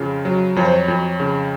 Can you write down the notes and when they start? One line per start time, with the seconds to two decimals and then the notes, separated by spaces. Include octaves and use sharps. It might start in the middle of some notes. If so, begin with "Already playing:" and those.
Already playing: F2 C#3 F4
0.25 F#3
0.56 F2 C#5
0.65 C5
0.72 C#5
0.88 F2
1.20 C#3